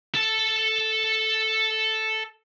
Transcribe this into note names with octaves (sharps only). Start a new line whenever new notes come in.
A4 A5